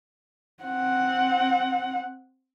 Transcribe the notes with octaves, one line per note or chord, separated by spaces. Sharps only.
C4 F#5